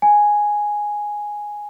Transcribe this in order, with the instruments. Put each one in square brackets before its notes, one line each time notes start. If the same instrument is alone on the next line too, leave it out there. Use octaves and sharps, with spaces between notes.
[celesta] G#5